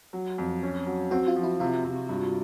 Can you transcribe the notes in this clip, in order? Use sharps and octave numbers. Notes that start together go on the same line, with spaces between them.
F#3
F2
C#4
F#3
C4 F#4
F4
F3
E4
C3 F4
C3
G2